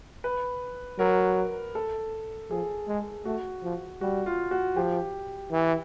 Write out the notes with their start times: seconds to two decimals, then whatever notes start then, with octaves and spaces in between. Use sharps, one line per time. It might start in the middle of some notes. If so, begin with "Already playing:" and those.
0.24 B4
0.99 F#3 A#4
1.75 A4
2.50 F3 G#4
2.88 G#3
3.25 A3 F#4
3.63 F3
4.01 G3 F#4
4.26 F4
4.51 F#4
4.76 F3 G4
5.52 E3